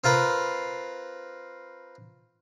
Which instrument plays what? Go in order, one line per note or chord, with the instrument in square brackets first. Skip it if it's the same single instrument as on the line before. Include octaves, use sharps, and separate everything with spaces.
[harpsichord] C4 F4 A#4 B4